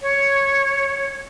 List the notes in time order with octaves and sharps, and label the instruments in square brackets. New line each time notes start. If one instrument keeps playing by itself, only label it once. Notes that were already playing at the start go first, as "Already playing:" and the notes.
[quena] C#5